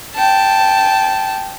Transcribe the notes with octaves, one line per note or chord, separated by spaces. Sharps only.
G5 A5